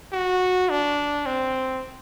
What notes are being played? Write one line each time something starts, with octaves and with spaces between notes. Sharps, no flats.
F#4
D4
C4